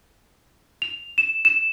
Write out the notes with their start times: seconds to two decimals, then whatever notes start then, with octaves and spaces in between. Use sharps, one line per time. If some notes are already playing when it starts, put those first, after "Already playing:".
0.82 F7
1.18 E7
1.45 E7